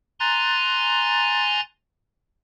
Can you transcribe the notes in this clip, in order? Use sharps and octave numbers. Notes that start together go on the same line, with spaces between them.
G#5 A#5 C6 F#6 A6